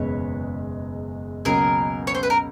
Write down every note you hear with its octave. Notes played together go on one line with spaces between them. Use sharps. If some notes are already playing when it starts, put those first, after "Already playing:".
Already playing: F#1 E2 B2 G#3 B4 C#5
C#2 B2 F#3 A#3 G#4 A#4
C#5
C5
B4
A#4